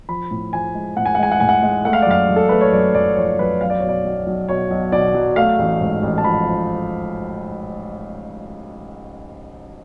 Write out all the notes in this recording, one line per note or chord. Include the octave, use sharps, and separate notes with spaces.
F3 B5
A2
F3 G#5
G#3
A2 F#5
G#5
F#5
G#3 G#5
F#5
A2 G#5
F#5
G#3
A3 F#5
F5
D5
F#2 F5
F#2
A4
A3 B4
C#5
F#2 D5
F#2 D5
F3 C#5
F#2 B4
B1 F5
D5
B2 C#5
D5
B1
B1
B2 C#5
B1
B2 D5
F#3
A3 F5
A1
G#2
A1
A5
F3 B5
F3